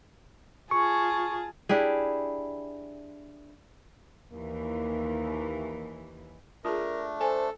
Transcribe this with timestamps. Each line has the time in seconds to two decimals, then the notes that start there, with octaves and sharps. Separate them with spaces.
0.71 F4 G#4 A5 C#6
1.69 D4 E4 G4 G#4
4.33 D#2 E3 A#3
6.65 A3 D4 F4 G#4 A#4
7.21 A4 C5 G#5